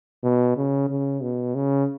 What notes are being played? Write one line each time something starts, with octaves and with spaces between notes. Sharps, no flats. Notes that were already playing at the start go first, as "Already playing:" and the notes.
B2
C#3
C#3
B2
C#3